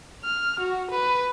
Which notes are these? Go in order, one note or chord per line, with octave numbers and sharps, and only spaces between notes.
F6
F#4
B4